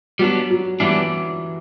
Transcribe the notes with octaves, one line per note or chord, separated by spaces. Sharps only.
F#3 G3 B3 D4
F#3
E3 G3 B3 D4